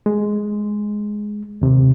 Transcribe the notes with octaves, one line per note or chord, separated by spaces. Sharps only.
G#3
D#2 C3